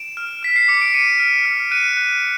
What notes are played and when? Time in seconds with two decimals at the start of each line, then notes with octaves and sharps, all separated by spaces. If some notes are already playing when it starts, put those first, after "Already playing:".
Already playing: D7 E7
0.17 F6
0.43 F6 B6
0.56 C7
0.68 D6 C#7
0.81 D7
0.94 D6 C#7 D#7
1.20 F6
1.46 F6
1.71 F#6 C#7 D#7
1.97 F#6